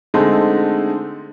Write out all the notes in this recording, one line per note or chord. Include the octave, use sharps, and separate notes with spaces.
D3 G#3 A3 C4 D#4